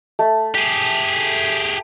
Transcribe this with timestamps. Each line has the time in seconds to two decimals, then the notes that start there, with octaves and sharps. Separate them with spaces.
0.19 A3
0.55 G4 G#4